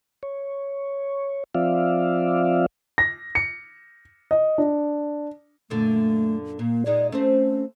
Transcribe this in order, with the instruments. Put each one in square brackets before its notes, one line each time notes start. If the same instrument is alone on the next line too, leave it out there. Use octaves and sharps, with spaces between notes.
[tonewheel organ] C#5
F3 C4 F4 D5 E5 F5
[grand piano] A#6
C#7
D#5
D4
[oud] F#2 A#2 D3 [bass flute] A3
[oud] A#2 [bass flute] A#3
[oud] A#2 G#3 D#4 [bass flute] D5
[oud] A3 C4 C5 [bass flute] C#4